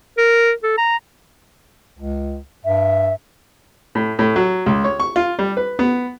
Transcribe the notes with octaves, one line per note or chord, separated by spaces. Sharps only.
A#4
A4
A#5
C#2
G2 E5
A2
A2
F#3
C#2
C#5
C#6
F4
G3
B4
B3